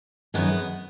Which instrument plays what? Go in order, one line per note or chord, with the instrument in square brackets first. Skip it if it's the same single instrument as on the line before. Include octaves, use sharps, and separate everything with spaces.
[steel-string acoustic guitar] F#2 D#3 G#3 B3